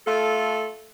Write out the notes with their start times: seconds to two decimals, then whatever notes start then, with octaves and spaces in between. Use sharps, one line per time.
0.06 A3 F4 A4